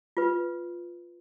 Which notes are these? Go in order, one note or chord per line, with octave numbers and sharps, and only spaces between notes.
F4 B4